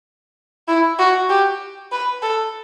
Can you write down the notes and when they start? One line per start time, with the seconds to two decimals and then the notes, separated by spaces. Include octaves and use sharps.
0.68 E4
0.99 F#4
1.29 G4
1.92 B4
2.22 A4